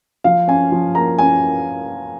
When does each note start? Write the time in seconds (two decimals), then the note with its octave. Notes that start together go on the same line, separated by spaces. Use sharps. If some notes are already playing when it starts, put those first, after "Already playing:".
0.24 F3 F5
0.47 C#4 G#5
0.72 F3
0.95 A#3 A#5
1.19 C#4 G#5